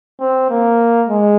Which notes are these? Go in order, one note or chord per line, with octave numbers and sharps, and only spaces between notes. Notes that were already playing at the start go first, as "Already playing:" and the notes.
C4
A#3
G#3